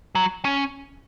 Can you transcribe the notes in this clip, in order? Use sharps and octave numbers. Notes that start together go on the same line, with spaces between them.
F#3
C#4